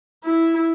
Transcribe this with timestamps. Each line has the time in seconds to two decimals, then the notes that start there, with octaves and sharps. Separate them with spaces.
0.25 E4